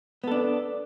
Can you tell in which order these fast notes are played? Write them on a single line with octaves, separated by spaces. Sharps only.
B3 A4 D4